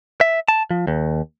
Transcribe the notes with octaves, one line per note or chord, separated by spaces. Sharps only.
E5
A5
F3
D#2